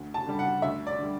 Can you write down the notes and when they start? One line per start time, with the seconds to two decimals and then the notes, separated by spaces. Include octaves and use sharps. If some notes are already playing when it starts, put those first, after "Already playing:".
Already playing: D2
0.14 A5
0.27 D3 G3
0.39 F#5
0.62 D2 E5
0.87 D5
0.99 D3 G3